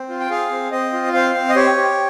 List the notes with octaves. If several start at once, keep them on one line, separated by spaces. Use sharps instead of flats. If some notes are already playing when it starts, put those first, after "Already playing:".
Already playing: C4
F4
G5
G#4 F5
C4
C4 D#5
F4
C4 F5
C4
D#5
G4 C#5
G4